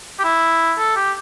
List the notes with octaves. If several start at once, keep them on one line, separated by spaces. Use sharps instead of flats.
G4
E4
A4
G4